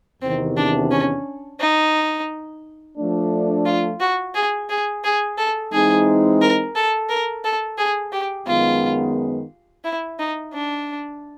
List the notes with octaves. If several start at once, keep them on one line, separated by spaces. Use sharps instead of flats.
E2 C3 D#3 C4
D4
C#4
D#4
F3 A3 D4
F4
F#4
G#4
G#4
G#4
A4
E3 G#3 C4 D#4 G#4
A#4
A4
A#4
A4
G#4
G4
F#2 D#3 G#3 B3 F4
E4
D#4
D4